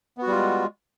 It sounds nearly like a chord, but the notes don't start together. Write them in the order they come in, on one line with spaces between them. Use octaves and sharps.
B3 F#4 G3 F4 G#3